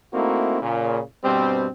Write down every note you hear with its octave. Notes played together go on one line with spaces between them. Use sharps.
A3 A#3 C4 D#4 E4 F#4
A#2 C#3
G2 B2 G3 C4